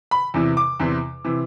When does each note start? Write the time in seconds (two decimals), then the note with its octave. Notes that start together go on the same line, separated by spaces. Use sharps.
0.11 B5
0.34 E2 C3 E3
0.57 D6
0.80 E2 C3 E3
1.24 C3 E3